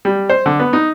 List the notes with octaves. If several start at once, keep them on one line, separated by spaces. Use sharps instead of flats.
G3
C5
D3
B3
D#4